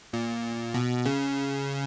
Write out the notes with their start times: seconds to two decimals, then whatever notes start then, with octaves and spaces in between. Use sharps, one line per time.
0.13 A#2
0.74 B2
1.06 C#3